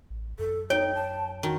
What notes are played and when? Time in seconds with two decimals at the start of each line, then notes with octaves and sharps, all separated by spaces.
0.10 A1
0.39 F#2 A4
0.70 D#4 C#5 G5
0.95 A5
1.43 D#3 F#4